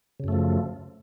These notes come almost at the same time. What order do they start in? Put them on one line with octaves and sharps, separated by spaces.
C#3 F#2 A3 F3